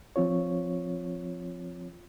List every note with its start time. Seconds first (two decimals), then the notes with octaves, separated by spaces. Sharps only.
0.16 F3 C4 F4 C#5